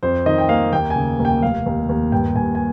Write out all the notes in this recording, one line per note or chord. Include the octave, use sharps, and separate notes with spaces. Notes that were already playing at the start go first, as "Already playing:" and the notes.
F2 C5
D#3 D#5
G5
A#3 F5
D#2 G5
G#5
C#3
D#2
G5
F1 F5
D#2
D#2
G2 G5
G2 G#5
G#5